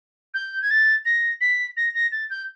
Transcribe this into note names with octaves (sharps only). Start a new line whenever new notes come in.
G6
G#6
A6
A#6
B6
A#6
A#6
A6
G6